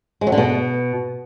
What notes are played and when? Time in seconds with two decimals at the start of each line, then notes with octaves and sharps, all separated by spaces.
0.21 G#3
0.27 F#3
0.32 D3
0.38 B2